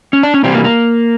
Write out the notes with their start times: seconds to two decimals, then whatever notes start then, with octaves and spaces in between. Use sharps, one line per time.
0.13 C#4
0.23 D4
0.34 C#4
0.43 C3 E3 G3 C4
0.54 A#3
0.64 A#3